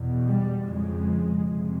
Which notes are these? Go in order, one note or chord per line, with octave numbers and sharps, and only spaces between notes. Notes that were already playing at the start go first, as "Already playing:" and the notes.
Already playing: E2 B2
G3
F2 C#3 G#3
F2 C3